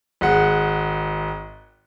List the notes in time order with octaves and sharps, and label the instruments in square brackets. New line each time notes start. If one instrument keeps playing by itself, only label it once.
[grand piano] G#1 G#3 F#5